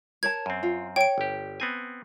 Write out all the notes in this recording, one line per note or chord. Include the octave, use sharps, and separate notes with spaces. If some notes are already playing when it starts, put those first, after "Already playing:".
A#4 C#5 A5 G#6
F#2 C4
F4
C#5 G5 D7
G1 G4
B3 C4 G#5